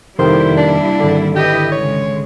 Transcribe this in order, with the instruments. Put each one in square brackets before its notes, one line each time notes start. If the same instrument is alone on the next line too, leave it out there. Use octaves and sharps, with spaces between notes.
[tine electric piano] F2 C3 D#3 [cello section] G3 A#3 E4 [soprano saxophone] C5
[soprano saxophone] D4
[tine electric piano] G#1 D3
[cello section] E4 B4 D#5 [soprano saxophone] G4
[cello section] C#3 G#3 [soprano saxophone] C#5